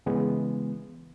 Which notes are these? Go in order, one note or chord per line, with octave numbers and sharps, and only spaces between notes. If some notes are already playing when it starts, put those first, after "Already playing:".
C#3 E3 G#3 B3